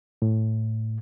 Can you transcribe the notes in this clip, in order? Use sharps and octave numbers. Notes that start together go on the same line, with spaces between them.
A2